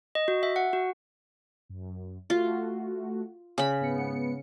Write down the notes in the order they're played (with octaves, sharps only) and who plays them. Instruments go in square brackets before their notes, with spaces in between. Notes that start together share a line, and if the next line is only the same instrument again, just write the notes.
[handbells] D#5
F#4
E5
F#5
F#4
[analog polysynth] F#2
[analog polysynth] A3 F#4 [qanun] F4
[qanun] C#3 B5
[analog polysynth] G#2 B3 C#7